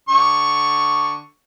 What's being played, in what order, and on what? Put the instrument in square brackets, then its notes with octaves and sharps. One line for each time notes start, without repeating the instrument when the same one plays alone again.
[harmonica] D3 C#6